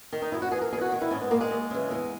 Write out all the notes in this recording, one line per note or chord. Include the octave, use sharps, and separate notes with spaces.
D#3
D#4
F#2 E4
F#4
E3 G#4
A#4
E2 G#4
F#4
D#3
E4
G#2 C#4
B3
D#3 A#3
G#3
D#2
C#3 E3
E2 G#3